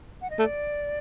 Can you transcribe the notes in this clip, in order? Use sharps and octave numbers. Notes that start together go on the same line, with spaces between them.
F#5
D#5
A3 D5